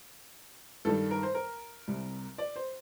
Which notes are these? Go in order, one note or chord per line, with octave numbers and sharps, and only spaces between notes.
G2 D#3 G3 A4
A#4
C5
A#4
C2 C3 G3
D5
C5